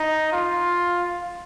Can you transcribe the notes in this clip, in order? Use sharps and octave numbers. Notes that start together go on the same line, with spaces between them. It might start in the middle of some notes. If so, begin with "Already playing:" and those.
Already playing: D#4
F4